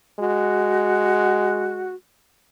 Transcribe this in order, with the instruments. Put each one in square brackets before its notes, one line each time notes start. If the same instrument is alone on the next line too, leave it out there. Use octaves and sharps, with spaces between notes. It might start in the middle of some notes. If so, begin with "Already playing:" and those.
[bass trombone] G#3 [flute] F#4